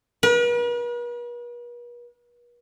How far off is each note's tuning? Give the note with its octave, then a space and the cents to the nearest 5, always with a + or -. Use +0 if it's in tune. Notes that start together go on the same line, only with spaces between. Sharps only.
B4 -45